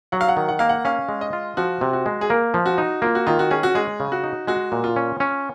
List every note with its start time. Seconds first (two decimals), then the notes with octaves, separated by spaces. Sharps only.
0.12 F#3 F#5
0.21 F5
0.28 F#5
0.37 D#3
0.48 F#5
0.59 A#3 F5
0.69 F#5
0.85 C#4 F5
1.09 G#3
1.21 D#5
1.33 F4
1.57 F3 F#4
1.81 C3
1.93 F#4
2.06 G#3
2.21 G#4
2.30 A#3 A#4
2.54 F3
2.66 F#4
2.78 D#4
3.02 A#3 F4
3.15 F#4
3.27 D#3 F4
3.39 F#4
3.51 C#4 G#4
3.63 F#4
3.75 G#3 G#4
4.00 C#3
4.12 F#4
4.24 D#4
4.47 G#3 F#4
4.72 A#2
4.84 F4
4.96 C#4
5.20 C#4